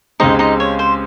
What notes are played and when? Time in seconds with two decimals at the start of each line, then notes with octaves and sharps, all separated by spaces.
0.20 C#2 C#3 G#3 C4 D#4 G4 D#5
0.39 D#4 D#5
0.60 C#5
0.79 C5